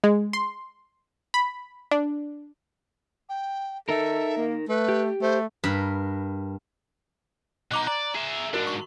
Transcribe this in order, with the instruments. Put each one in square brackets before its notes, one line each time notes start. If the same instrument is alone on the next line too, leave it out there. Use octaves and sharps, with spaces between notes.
[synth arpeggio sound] G#3
C6
B5
D4
[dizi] G5
[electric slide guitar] D#4 A#4 [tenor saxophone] A4 [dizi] E5
[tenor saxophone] A#3
[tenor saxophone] A3 [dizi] B4
[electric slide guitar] G4
[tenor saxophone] A3 [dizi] C5
[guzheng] G2 A#4 B5
[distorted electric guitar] B2 D#4 [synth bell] A#5 D6 F#6
[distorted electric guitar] D5 [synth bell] A#5
[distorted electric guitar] G#4 E5
[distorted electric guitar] G#2 D4 [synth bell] F#4 A#4
[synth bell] C#6